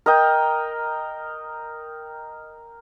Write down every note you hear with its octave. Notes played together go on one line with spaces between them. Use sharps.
A#4 D#5 G5